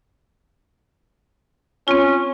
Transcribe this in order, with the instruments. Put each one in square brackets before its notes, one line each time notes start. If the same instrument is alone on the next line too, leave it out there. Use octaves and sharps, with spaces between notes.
[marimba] C4 F4 [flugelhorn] C#4